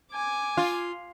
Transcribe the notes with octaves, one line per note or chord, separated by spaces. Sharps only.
G#5 D6
F4